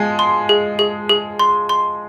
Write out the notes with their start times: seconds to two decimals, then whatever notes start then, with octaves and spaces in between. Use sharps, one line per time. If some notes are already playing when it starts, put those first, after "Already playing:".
Already playing: F3 G#3 G#5
0.19 C6
0.49 G#4
0.79 G#4
1.09 G#4
1.39 C6
1.69 C6